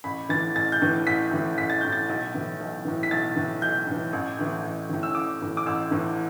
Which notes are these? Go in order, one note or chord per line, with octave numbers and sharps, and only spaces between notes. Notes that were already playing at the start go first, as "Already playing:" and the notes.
A1 B5
A2 E3 A6
A1 A6
G6
A2 E3
A1 B6
A2 E3
A1 B6
A6
A2 E3 G6
A6
B1
A2 E3
B1
A2 E3
B6
B1 A6
A2 E3
B1 G6
A2 E3
A1
A2 E3
A1
A2 E3
E6
A1 D6
A2 E3
D6
A1 E6
A2 E3